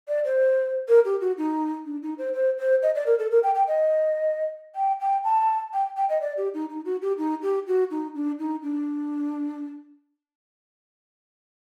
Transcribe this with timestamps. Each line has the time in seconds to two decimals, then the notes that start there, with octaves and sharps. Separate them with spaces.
0.08 D5
0.25 C5
0.88 A#4
1.05 G4
1.21 F#4
1.38 D#4
1.86 D4
2.03 D#4
2.18 C5
2.34 C5
2.58 C5
2.83 D#5
2.95 D5
3.06 A#4
3.19 A4
3.31 A#4
3.43 G5
3.55 G5
3.68 D#5
4.76 G5
5.01 G5
5.24 A5
5.74 G5
5.97 G5
6.09 D#5
6.21 D5
6.37 G4
6.54 D#4
6.70 D#4
6.85 F#4
7.02 G4
7.18 D#4
7.42 G4
7.67 F#4
7.91 D#4
8.15 D4
8.39 D#4
8.63 D4